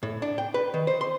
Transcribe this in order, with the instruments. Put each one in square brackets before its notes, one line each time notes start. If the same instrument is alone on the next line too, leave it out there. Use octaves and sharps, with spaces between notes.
[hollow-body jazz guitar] A2
D4
G5
B4
D#3
C5
C6